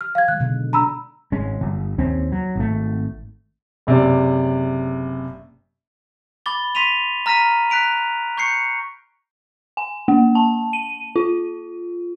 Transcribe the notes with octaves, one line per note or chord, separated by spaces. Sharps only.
F6
F5 G#6
D#3 F#3 G#3 F#6
B2 D3
D4 A#5 B5 E6
G#1 G#3 C#4
G1
D#2 C4 C#4
F#3
G#1 A3
F#1 C3 C#4 D5
B5 D6 A6 G7
C6 B6 D#7 F7
A#5 F6 A#6 B6 D#7
F#6 B6 D7 F7
C#6 G6 C7 C#7
G#5
A#3
A5
D#7
F4